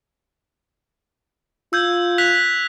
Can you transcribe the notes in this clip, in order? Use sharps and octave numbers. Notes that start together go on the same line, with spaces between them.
F4 E6 G6 G#6
F#6 B6 F7